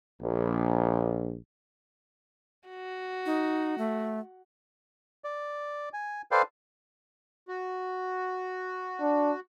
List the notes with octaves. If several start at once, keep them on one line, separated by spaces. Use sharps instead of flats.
A#1
F#4
D#4
A3
D5
G#5
A4 B4 C5 D5 F5 G5
F#4
D4